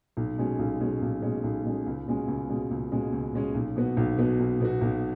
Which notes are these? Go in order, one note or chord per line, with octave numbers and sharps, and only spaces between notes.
B1
B2 G#3 C#4
B1
B2 G#3 C#4
B1
B2 G#3 C#4
B1
B2 G#3 C#4
C#2
B2 G#3 C#4
C#2
B2 G#3 C#4
C#2
B2 G#3 C#4
C#2
B2 G#3 C#4
B1
B2 B3 F#4
B1
B2 B3 F#4
B1
B2 B3 F#4
B1